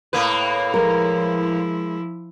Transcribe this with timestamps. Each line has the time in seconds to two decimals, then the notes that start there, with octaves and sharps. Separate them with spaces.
0.13 A2 A#3 B4
0.74 F3 G#3 E4 A#4